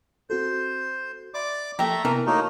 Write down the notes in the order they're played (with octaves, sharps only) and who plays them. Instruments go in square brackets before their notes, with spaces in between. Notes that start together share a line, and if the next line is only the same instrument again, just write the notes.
[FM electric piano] C4 F#4 A4 [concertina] C5
[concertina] D5 D6 [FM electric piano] E5 B5 C6
[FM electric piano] F3 A#3 A4 [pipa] A3 G4 [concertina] E5 A#5
[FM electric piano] C3 A#3 B3 [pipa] E3 A#4
[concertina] A3 A#3 D#4 [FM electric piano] F#4 C#5 F6